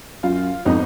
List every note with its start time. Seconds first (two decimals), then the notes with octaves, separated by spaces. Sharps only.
0.23 F#2 F4
0.65 G#1 F2 B3 D#4